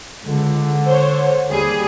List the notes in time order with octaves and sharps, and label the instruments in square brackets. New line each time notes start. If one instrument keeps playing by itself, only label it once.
[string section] C#2 [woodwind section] D3
[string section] C5 C#5
D#2 G3 G#4